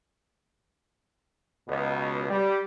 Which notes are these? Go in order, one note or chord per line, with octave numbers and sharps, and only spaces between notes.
C#2 B2
G3